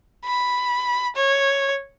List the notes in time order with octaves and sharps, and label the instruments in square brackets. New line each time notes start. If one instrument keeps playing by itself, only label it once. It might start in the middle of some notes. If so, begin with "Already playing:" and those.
[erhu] B5
C#5